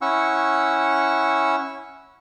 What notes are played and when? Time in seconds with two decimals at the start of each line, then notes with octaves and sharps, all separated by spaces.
0.02 C#4 E4 F#5 C#6 E6